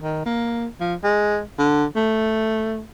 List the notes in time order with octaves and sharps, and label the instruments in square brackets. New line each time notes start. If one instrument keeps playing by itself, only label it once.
[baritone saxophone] D#3
A#3
F3
G#3
D3
A3